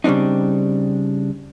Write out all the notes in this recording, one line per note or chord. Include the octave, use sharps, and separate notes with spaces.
C#3 G3 C4 D4 D#4